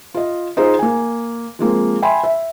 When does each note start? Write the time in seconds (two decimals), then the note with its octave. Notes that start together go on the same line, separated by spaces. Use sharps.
0.14 F4 D#5
0.57 D#4 F4 G#4 C5
0.79 A#3 G#5
1.59 F3 G#3 A#3 C4
2.02 E5 G5 G#5 B5 C6
2.24 E5